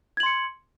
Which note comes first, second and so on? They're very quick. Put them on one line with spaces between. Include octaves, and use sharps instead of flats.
G#6 F#7 C6 C#7